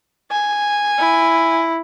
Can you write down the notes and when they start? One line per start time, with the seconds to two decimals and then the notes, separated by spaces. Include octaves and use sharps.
0.31 G#5
0.99 E4